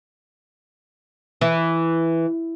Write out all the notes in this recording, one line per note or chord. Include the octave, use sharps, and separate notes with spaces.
E3